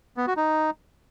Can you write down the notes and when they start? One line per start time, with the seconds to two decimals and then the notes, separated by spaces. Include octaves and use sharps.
0.17 B3
0.27 F#4
0.37 D#4